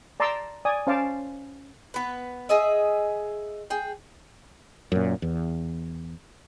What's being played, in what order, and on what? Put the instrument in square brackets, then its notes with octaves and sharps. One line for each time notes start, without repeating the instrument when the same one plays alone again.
[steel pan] D5 A5 A#5 C6 D6 E6
D5 G#5 D#6
C#4 C5 F5 A5 D6
[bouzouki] B3 B4
G#4 D#5 E5
G#4 G5
[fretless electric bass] F#2 A#2
E2